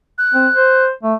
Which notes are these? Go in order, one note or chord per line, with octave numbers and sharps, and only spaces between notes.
F#6
C4
C5
A3